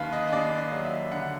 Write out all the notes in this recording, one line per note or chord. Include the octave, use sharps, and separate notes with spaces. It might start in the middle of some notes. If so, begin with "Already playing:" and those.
Already playing: D#2 D#3 B4 F5
D#5
D#5
D#2 D5
D#5
F#3
E5
D3 F#5